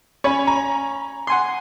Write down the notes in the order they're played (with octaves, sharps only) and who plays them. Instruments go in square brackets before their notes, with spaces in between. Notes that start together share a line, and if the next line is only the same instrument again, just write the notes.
[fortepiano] C#4 [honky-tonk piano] C#5 B5
[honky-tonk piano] A#5
[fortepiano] F#5 G#5 C6